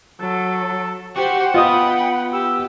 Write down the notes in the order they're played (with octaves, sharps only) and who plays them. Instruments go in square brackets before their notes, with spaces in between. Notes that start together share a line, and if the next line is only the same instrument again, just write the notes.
[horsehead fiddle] F#3 [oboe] A4
[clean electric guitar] F#4 [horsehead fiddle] G4 C5 [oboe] F#5
[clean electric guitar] B3 [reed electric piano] F4 D#5 D#6 [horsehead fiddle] G5 B5
[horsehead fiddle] G4 [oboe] E6